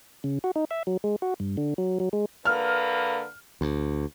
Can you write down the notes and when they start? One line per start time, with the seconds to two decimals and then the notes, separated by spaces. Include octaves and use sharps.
0.24 C#3
0.44 F#4
0.56 D#4
0.71 E5
0.87 F#3
1.04 G#3
1.22 F#4
1.40 G2
1.57 D3
1.78 F#3
2.00 F#3
2.13 G#3
2.45 D3 A#3 B4 F6
3.61 D2